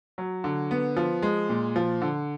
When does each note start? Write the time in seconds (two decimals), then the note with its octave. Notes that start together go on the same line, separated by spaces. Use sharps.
0.18 F#3
0.44 D3
0.71 B3
0.96 F3
1.23 G#3
1.49 A#2
1.76 F3
2.02 D3